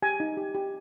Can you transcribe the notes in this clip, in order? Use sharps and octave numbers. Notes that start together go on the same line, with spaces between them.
G4 G#5
D#4
G4
G4